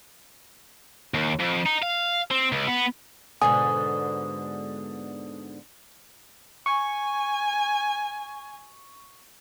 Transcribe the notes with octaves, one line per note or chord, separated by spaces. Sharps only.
D#2
F2
D#4
F5
C4
C#2
B3
G#2 B2 D3 G#5 D#6
G#5 C#6